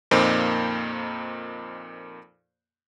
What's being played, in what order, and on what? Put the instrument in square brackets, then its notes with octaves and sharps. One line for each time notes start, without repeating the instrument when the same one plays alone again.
[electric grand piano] F2 A#2 A#3 D#4 C5